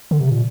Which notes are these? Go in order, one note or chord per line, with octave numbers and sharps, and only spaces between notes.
D3
C3
A#2